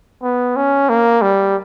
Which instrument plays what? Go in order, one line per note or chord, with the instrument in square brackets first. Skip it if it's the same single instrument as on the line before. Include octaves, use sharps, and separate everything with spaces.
[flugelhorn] B3
C#4
A#3
G3